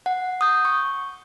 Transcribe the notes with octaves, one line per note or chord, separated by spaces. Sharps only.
F#5
D#6 G6
C#6